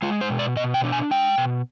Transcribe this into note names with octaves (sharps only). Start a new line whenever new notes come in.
G#3 F4
C5
B2
D5
B2 D#5
G5
D4
G#5
G#3 G5
B2